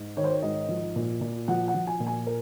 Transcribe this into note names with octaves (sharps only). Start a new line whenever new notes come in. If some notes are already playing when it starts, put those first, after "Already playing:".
Already playing: G#2
D#3 C#5
C5
C#5
G#2 D#5
F3
A#2
A#2
F3 F#5
F#5
F3
G#5
A#2
G#5
A#4